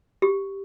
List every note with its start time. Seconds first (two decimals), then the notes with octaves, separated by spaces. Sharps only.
0.22 G4